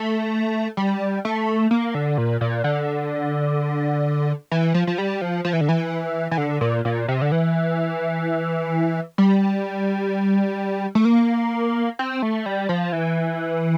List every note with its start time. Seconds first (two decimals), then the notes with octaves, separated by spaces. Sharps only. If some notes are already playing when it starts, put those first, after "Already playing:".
Already playing: A3
0.77 G3
1.25 A3
1.71 A#3
1.94 D3
2.18 A#2
2.41 A#2
2.64 D3
4.51 E3
4.74 F3
4.87 F3
4.98 G3
5.22 F3
5.45 F3
5.53 E3
5.61 D3
5.69 E3
6.31 E3
6.38 D3
6.61 A#2
6.85 A#2
7.08 C3
7.22 D3
7.32 E3
9.18 G3
10.95 A3
11.05 A#3
11.99 C4
12.22 A3
12.46 G3
12.69 F3
12.92 E3